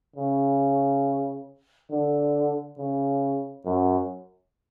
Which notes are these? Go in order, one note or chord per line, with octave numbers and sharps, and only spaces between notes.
C#3
D3
C#3
F#2